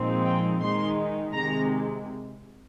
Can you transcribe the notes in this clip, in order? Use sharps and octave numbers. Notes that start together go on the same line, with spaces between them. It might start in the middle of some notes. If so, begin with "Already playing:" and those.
Already playing: A#2 F3 G#3 C4 D#4
G5
D#3 G#3 D#4 C6
C3 D#3 G#3 A#5